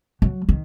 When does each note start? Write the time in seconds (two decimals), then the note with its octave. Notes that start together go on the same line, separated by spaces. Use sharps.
0.22 F#3
0.49 D#3